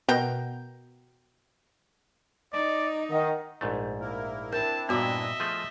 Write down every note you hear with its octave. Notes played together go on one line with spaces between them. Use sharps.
B2 F#4 A#4 G5
D#4 D5 D#5
D#3 D#5 F#5
A#1 G#2 A3
A#3 E4 A#4
C4 D4 E4 A#4 A5
G2 A#2 B3 F#4 D#5 E5 D6
F3 A3 G#4